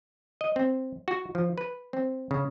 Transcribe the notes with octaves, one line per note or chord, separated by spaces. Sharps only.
D#5
C4
F#4
F3
B4
C4
C#3